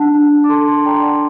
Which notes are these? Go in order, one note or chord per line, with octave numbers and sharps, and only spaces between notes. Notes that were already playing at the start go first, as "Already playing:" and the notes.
Already playing: D4 F#5 A5
D4
D6
A4 A5 C6
A5 C6
D5 G5 A#5
F#5 A5